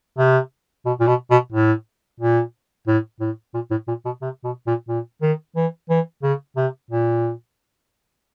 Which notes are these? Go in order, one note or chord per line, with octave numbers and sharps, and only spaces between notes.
C3
B2
A#2
B2
B2
A2
A#2
A2
A2
A#2
A2
A#2
B2
C3
B2
A#2
A#2
D#3
E3
E3
C#3
C3
A#2